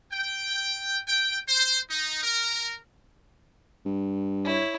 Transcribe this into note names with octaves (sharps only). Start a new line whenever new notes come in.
G5
G5
C5
D#4
A#4
G2
E4 C#5